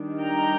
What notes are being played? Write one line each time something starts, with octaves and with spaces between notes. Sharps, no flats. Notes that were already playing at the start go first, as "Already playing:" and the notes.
Already playing: D#3 G3 D4
G5 A#5